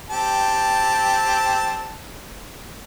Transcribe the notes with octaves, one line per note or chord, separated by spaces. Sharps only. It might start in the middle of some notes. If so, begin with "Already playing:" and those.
C4 G4 A5